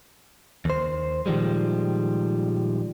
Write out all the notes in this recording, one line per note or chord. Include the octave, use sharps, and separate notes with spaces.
D#2 C5
A#2 D#3 F3 G3 G#3